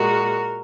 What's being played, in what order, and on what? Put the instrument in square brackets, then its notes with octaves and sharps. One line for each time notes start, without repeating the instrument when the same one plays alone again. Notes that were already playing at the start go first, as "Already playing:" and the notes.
Already playing: [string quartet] A#2 G#3 F#4 A#4